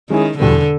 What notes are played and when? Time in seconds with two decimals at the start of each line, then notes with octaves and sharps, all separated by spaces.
0.10 D#3 G#3 C#4 E4 G#4
0.38 E2 B2 D3 G3 B3